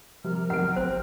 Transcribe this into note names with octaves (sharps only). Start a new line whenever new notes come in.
C3 F3 G3 A#4 F6
B1 C3 F#5 D7
G1 C4 C5